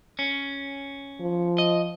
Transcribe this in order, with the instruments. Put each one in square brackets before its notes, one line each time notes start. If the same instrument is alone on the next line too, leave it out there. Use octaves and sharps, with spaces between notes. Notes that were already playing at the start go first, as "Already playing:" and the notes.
[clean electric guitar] C#4
[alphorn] F3
[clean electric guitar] D#5